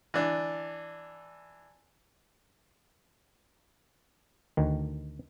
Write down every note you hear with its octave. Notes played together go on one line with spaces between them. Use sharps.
E3 D4
D2 D#3